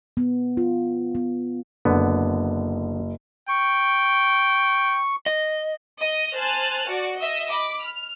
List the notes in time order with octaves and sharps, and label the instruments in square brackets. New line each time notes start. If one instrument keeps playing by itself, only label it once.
[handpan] B3
F4
B3
[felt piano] F#1 [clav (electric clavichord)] D3 B3
[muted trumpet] G5 [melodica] C#6
[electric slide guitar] D#5
[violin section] D#5
C5 G#5 A5 F6 F#6 A6
F#4 D5
D#5 E5
B5 D6
F6